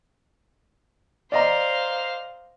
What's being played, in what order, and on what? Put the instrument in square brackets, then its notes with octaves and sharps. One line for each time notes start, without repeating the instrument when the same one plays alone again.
[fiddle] C5 F5 [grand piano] D5 D#5 A#5